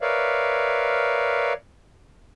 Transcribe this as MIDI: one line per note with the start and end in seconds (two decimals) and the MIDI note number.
0.01 1.53 70
0.01 1.53 71
0.01 1.53 73
0.01 1.53 74
0.01 1.53 76
0.01 1.53 77